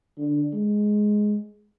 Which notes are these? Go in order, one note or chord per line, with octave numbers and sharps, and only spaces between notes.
D3
G#3